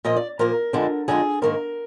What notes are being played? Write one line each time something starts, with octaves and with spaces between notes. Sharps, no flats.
A#2 F3 A#3 D#5
D5
A#2 F3 A#3 A#4
F2 D3 G#3 D4
F2 D3 G#3 D4 G#4
G#2 D#3 A#3 A#4